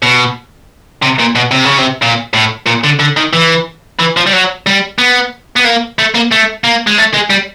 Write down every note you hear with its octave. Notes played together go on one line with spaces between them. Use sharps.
B2
C3
A#2
B2
C3
C#3
C3
A#2
A2
A#2
D3
D3
D#3
E3
E3
F3
G3
F#3
G3
B3
B3
A#3
A3
A#3
A3
A#3
G#3
A3
G#3
G3